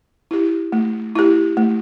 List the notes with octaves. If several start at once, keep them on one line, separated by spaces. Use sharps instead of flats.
E4 G4
A3
E4 G4
A3